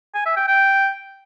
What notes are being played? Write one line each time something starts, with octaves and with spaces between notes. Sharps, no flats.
G#5
E5
G5
G5